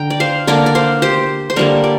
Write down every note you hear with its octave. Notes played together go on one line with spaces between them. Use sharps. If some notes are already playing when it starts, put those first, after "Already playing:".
Already playing: D3 G5 A#5
D5
C5 F5
D3 A#3 A#4 D5
D5
C5 F5
G4 C5
C5
D3 G3 A#3 A#4 D5
D5